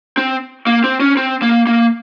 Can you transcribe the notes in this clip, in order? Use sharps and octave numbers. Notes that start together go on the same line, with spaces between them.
C4
A#3
C4
C#4
C4
A#3
A#3